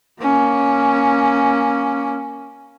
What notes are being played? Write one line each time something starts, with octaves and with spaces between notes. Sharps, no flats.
A#3 C#4